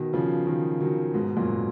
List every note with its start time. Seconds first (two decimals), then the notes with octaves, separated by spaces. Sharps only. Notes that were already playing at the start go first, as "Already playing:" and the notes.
Already playing: B2 D#3
0.13 C#3 F3
0.47 D#3 F#3
0.81 D#3 F#3
1.14 G#2 B2
1.36 F#2 A#2